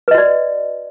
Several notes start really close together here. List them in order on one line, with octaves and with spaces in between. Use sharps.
B4 D#5 F#4 D5